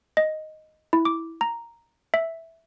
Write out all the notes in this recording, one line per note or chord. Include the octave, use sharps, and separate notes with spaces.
D#5
E4
D6
A#5
E5